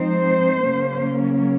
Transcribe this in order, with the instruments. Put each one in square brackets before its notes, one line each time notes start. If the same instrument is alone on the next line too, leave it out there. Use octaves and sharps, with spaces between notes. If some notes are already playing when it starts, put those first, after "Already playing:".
Already playing: [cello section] F3 G#3 C4 D#4 C5
C#3 F#3 A#3 C#4